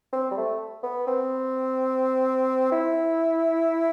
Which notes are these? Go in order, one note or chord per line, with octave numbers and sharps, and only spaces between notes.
C4
G3
A3
B3
C4
E4